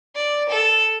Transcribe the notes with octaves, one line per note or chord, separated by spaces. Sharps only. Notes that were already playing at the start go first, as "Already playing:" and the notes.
D5
A4